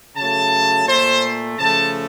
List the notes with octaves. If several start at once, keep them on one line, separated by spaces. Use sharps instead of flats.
C#3 F#3 A3 A5
A#2 A3 C5
C#3 F3 A3 A5